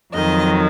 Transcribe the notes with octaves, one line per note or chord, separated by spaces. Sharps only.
F2 D#3 F#3 D#5